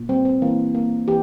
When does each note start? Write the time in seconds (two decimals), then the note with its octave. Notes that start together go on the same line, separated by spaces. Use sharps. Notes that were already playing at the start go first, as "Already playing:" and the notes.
Already playing: A#2
0.09 G3 C4
0.25 C4
0.42 E3 A#3
0.75 A#3
1.08 E3 G4